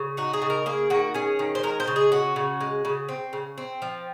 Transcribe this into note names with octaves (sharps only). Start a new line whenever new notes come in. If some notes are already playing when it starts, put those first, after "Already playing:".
Already playing: C#3
D#4 F#4
G#4
C#3
A#4
A#3 G#4
D#3 F#4
C#4 G#4
D#3
C5
G#3 A#4
C5
C#3
G#4
C#4 F#4
C#3
G#3
C#3
C4
C#3
C4
F3